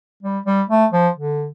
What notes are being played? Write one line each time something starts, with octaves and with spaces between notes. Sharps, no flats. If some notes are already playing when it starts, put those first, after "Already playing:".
G3
G3
A3
F3
D3